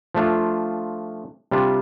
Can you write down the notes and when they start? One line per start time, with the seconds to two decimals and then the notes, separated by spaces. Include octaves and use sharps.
0.15 F3 A3 D4 F4
1.51 C3 G3 D4 F4